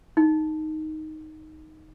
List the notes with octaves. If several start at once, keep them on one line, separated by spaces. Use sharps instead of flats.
D#4